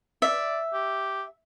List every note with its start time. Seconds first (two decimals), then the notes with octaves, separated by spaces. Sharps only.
0.22 D5 E5
0.74 G4